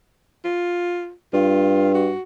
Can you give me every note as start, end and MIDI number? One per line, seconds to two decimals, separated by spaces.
0.45 1.12 65
1.33 2.12 43
1.33 1.90 65
1.95 2.22 66